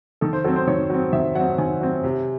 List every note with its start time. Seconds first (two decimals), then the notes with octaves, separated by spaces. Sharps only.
0.21 D#3 A4
0.33 C5
0.44 F#3 C4 A4
0.56 C5
0.67 D#3 C#5
0.90 F#3 C4
1.13 D#3 E5
1.35 F#3 C4 F#5
1.58 D#3 G#5
1.81 F#3 C4
2.04 C3